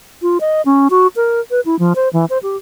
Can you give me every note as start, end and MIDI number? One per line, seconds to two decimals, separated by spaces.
0.22 0.38 65
0.41 0.62 75
0.65 0.88 61
0.90 1.07 66
1.16 1.40 70
1.51 1.60 71
1.66 1.78 64
1.79 1.93 53
1.96 2.09 72
2.13 2.25 52
2.30 2.38 72
2.43 2.57 67